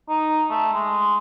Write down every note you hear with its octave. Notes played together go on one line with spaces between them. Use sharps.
D#4
A3
G#3